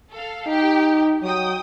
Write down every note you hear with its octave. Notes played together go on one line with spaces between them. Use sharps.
A4 F5
D#4 G4
F#3 G5 D#6